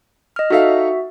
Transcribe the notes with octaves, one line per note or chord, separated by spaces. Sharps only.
D#5 F6
D#4 F#4 A4 E5 F5